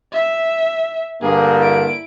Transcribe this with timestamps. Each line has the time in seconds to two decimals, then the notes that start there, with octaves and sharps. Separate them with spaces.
0.13 E5
1.22 G2 D3 A#3 G#4
1.59 E4 D7